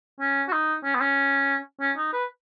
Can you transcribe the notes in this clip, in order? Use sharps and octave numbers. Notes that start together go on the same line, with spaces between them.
C#4
F#4
D#4
C#4
B3
C#4
C#4
D#4
B4